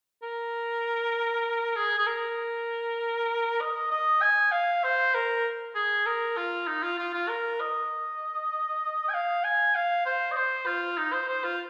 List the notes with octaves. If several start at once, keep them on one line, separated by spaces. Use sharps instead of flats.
A#4
G#4
G#4
A#4
D#5
D#5
G#5
F5
C5
A#4
G#4
A#4
F4
D#4
F4
F4
F4
A#4
D#5
G#5
F5
G#5
F5
C5
D#5
C5
F4
D#4
C5
C5
F4